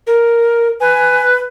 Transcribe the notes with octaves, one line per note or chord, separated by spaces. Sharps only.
A#4
B4 G#5